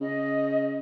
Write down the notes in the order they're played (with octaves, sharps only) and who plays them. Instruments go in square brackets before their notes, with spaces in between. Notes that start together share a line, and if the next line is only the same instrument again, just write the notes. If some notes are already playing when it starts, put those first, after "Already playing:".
[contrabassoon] C#3 [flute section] D#5